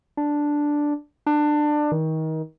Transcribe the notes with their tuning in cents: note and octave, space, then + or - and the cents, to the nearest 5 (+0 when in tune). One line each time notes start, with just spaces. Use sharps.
D4 +0
D4 +20
D#3 +30